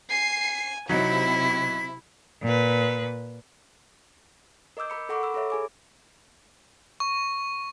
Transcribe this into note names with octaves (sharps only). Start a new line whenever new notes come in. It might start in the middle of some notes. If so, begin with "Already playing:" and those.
G#5 C7
C3 F#3 D#4 E4 B6
A#2 B4
A#4 D#5 D6 E6 G6
A#4 B5 C#7
A4 F#5 B5 C#6 D6
B5 E6
A4 A#4 C#5 E5
G#4 G#5 D6
C#6